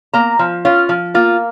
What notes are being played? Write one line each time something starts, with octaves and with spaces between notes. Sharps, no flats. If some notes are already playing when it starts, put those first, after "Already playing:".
A#3 A#5
F3
C#4 F4
F3
A#3 F4